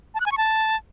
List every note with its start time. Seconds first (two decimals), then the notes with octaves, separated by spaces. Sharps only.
0.15 A5
0.20 F#6
0.26 G#5
0.32 C#6
0.38 A5